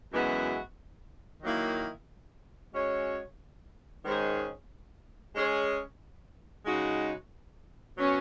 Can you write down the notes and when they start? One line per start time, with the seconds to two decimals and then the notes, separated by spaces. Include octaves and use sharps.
0.12 F#2 E3 G#3 B3 F#4
1.43 D#3 F#3 A#3 E4
2.74 G#3 C#4 F#4 C#5
4.05 G#2 D#3 G#3 C#4 G#4
5.36 G#3 C#4 G#4 C#5
6.66 C#3 G#3 D#4 F#4
7.97 B2 F#3 C#4